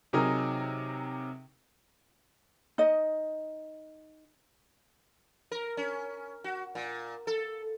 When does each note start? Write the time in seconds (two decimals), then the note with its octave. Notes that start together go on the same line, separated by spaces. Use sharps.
0.13 C3 F#3 D#4 G#4 A#4
2.78 D#4 D#5
5.51 A#4
5.77 C#4
6.44 F#4
6.75 A#2
7.27 A4